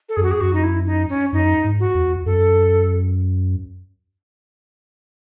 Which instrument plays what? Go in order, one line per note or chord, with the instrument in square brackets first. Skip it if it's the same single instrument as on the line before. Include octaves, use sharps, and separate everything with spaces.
[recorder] A4
[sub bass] F#2 [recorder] G#4
[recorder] F#4
G#4
[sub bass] F#2 [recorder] F#4
[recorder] D#4
E4
D#4
C#4
[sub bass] F#2 [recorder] D#4
[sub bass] G#2
[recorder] F#4
[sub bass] E2
[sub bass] F#2 [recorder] A4